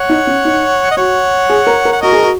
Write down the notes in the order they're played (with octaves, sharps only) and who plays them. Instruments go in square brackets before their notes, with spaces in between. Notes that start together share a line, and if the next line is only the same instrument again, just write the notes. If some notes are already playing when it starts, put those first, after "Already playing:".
Already playing: [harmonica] C#5 F#5
[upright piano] D#4
C#4
D#4
[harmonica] D#5
[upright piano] F#4 [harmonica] C#5 F#5
[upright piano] G#4
A#4
A#4
[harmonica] F#5
[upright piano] F#4 [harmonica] A#4 D#5
[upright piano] G#4
F#4